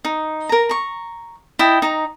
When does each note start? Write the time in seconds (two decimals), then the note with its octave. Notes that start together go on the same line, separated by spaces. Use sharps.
0.05 D#4
0.49 A#4 A#5
0.69 A#5 C#6
1.59 E4 D#5 G5 A5
1.82 D#4 A#5